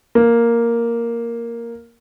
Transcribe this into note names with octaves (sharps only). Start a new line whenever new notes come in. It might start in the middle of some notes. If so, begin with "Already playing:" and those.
A#3